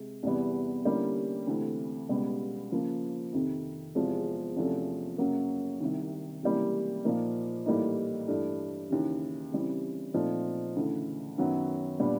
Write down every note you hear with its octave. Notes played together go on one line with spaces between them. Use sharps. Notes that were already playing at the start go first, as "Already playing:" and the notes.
Already playing: C3 G#3
E2 C3 E3 G3 B3
D3 G3 A#3 C#4 E4
D2 C3 E3 A3 C4
C#2 B2 G3 B3
C#3 F3 A#3
F2 C3 D#3
E2 C3 F3 G#3
E2 C3 F3 A3 C#4
F#2 C#3 F#3 A#3
C2 C3 D#3
C#2 C3 E3 G3 A#3
A#2 F3 A#3 D#4
A2 E3 G3 A#3 D#4
G2 E3 A3
D#2 C#3 E3
C#3 E3 G3 C4
A#2 F3 A3 C4 D#4
D2 C#3 E3
F#2 D#3 F#3 B3
A#2 G3 B3 D4